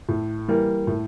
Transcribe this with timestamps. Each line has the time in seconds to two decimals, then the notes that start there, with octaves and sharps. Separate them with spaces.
0.09 A2
0.48 E3 G3 A#3
0.87 A2